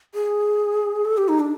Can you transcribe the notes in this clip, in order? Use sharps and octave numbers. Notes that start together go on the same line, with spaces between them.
G#4
A4
G4
D#4
D4